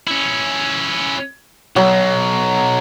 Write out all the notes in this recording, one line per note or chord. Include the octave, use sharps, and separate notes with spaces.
C#4 E4
B1 F#3